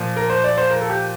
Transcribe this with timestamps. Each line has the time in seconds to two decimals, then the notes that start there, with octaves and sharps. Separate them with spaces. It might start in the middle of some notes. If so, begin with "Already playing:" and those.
Already playing: A#2 F3
0.16 A#4
0.30 C5
0.44 D5
0.58 C5
0.70 A#4
0.81 A4
0.89 G4